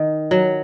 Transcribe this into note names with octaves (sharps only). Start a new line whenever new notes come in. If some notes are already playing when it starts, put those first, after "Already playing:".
Already playing: D#3
F#3